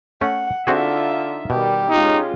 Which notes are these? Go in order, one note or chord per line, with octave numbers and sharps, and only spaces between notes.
A3 C#4 F#5
D3 C4 D#4 F4 F#4 G#4 E5
B2 D#3 G3 G4
G#3 C#4 D#4 F4